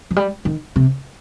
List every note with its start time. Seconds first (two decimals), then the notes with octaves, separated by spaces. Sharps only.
0.11 F3
0.16 G3
0.45 D#3
0.76 C3